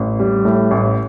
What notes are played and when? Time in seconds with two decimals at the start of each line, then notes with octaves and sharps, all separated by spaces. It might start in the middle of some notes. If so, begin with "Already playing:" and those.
Already playing: A1
0.19 G3
0.45 A2
0.71 A1